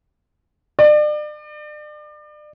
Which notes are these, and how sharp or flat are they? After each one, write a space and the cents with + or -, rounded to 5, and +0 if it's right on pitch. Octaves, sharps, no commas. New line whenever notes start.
D5 +35